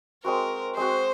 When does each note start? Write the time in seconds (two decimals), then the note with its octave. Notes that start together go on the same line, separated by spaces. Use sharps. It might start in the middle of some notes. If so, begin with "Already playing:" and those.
0.24 G#3 C4 F#4 A#4
0.77 G#3 C4 F#4 C5